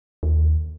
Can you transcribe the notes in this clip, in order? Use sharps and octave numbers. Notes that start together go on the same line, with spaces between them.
D#2